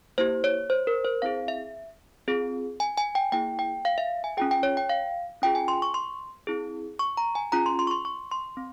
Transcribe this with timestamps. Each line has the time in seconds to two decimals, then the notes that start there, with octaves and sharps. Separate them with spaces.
0.18 A#3 E4 G4 C5
0.44 C#5
0.70 C5
0.87 A#4
1.04 C5
1.22 C4 E4 G#4 F5
1.48 E5
2.28 C4 F4 G#4
2.80 G#5
2.97 G#5
3.15 G5
3.32 A#3 E4 G#4 G5
3.59 G5
3.85 F5
3.98 E5
4.24 G#5
4.37 C#4 F4 G#4 G5
4.51 G5
4.63 C#5
4.77 G5
4.89 F5
5.42 C#4 F4 G#4 G5
5.55 G#5
5.68 C6
5.82 C#6
5.94 C6
6.47 C4 E4 G#4
6.99 C#6
7.17 A#5
7.35 G#5
7.52 C#4 F4 G#4 A#5
7.66 C6
7.79 C6
7.87 C#6
7.91 C6
8.05 C#6
8.31 C6
8.57 C4